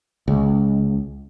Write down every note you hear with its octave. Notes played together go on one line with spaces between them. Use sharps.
C#2